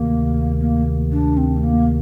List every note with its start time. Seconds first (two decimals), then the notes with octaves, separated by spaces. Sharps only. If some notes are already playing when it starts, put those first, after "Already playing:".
Already playing: D2 C3 D#3 A#3
0.60 A#3
1.12 D4
1.37 C4
1.56 A3
1.63 A#3